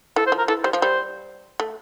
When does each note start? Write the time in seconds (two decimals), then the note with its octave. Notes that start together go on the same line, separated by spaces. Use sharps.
0.16 E3 A4
0.26 C5
0.32 F3
0.38 A#4
0.48 E3 A4
0.64 G3 C5
0.73 F3
0.80 G3 C5
1.60 A3